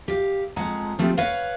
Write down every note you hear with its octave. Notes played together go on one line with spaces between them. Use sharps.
G4 F5
F2 F3 G#3 F#5 A#5
F3 A3 C4 F4 G4
B4 C#5 F5 F#5